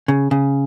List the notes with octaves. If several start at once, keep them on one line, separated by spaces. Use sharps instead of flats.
C#3
C#3